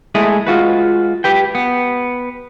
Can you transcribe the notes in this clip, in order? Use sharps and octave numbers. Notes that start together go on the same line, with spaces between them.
G#3 A3 E4 G#4
G#3 F4 F#4 B4
G4 B4 G5
B3